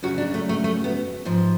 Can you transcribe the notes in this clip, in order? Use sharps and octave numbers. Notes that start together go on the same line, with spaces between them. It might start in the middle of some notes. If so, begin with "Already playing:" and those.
F#2 C#3 F#3 F#4
D4
A3
A3
A3
B3
G#2 F3